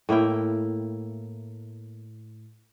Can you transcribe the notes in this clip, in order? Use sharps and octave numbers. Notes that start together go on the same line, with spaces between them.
A2 A#3 E4 G5